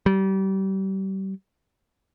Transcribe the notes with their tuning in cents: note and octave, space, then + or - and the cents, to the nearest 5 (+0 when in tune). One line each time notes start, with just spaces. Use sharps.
G3 -30